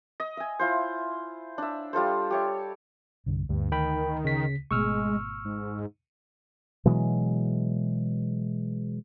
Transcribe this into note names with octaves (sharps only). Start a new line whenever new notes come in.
D#5
E5 G#5
E4 F4 C5
D4 E5
G3 F4 A4 C5
G4 C#5 E5
C2 G2 D3
D2 G2
D#3 A#4 G5 B5
C#3 B6
G#1 B2 G#3 A3 C#6 E6 F6
G#2
B2 E3 F#3 G#3